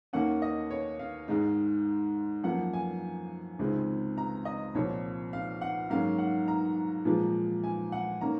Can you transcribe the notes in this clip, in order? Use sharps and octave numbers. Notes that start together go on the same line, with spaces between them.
D#2 D#3 A#3 C#4 F#5
D#5
C#5
F5
G#2 D#3 G#3 D#4
F#2 F3 A#3 F#5
G#5
C#2 C3 D#3 G#3 C4
A#5
D#5
C2 A#2 F3 C4 C#5
F5
F#5
G#2 F#3 A#3 C#4 F5
F#5
A#5
A#2 F3 G#3
G#5
F#5
D#3 A#3 C#4 A#5